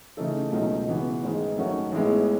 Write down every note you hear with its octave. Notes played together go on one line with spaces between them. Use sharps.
C#3 E3 A3 D#4 A4
C#2 B2 F#3 A3 D#4
C#3 E3 B3 F#4 B4
A1 G#2 D#3 G#3
F#2 D#3 A3 C#4 F#4
A1 A2 G#3 B3